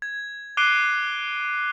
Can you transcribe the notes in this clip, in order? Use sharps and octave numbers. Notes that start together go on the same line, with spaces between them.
G#6
D6 F#6 C7 D7 D#7 G7